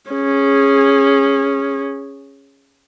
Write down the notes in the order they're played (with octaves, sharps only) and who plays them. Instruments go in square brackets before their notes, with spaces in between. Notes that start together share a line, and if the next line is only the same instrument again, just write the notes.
[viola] C#4 G#4